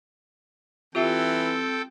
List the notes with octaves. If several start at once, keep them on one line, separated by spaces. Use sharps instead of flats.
E3 C4 F4 G4 A4 E5 G5